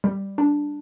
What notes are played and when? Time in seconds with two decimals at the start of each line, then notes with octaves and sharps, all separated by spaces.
0.04 G3
0.38 D4